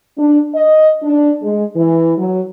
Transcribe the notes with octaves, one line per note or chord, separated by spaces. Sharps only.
D4
D#5
D4
G#3
E3
F#3